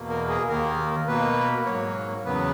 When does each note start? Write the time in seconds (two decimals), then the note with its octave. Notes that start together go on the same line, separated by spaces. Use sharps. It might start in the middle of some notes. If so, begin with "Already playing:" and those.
Already playing: E2 B2 A#3
0.10 A#4
0.29 G#4
0.49 D#2 D#3 A#3 A#4
1.07 B2 A#3 B4
1.66 G#2 F#3 A#3 C#5
2.25 E2 C#3 F#3 B3 B4